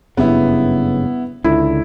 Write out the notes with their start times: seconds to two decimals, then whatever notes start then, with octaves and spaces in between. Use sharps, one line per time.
0.17 F#1 G2 C#3 B3 E4
1.44 C#2 D3 E4